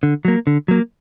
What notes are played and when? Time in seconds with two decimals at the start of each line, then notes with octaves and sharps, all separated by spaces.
0.03 D3
0.25 F#3 A#3
0.47 D3
0.68 F#3 A#3